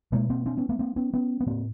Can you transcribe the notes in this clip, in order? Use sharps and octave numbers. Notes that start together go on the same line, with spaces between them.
B2 G#3 A#3
A#3 C4
C4 D4
B3 C#4
A3 B3
A#3 C4
B3 C#4
B3 C#4
B3
A2 A#3 C4